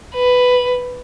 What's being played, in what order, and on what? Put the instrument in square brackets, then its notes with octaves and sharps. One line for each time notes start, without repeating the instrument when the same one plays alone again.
[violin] B4